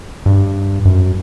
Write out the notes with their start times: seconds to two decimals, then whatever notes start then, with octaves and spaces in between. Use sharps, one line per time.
0.26 G2
0.85 F#2